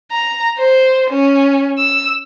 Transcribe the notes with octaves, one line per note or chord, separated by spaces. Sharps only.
A#5
C5
C#4
E6